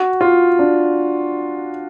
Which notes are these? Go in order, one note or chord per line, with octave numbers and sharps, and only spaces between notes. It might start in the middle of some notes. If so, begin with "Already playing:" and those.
Already playing: F#4
F4
D4